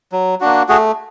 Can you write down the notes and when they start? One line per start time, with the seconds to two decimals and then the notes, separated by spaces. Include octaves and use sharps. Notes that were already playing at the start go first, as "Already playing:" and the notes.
0.12 F#3
0.40 A#3 D4 F#4
0.68 A3 F#4 G#4